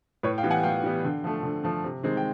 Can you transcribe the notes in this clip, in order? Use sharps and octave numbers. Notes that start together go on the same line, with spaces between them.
A2 B4 C#5
F5 G5
E3 G3 B3
F#5 G#5
A2 F5 G5
E3 G3 B3
D3
F3 A3
D3
F3 A3
C3
D#3 G#3 C4
G5